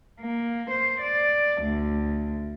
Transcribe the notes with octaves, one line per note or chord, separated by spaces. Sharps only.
A#3
C5
D5
D2